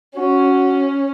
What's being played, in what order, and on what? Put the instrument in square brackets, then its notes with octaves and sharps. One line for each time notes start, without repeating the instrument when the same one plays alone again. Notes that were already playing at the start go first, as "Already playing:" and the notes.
[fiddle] C#4 [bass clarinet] F#4